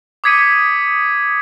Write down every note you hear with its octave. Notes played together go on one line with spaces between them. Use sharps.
D6 D#6 G#6 B6 C#7 D#7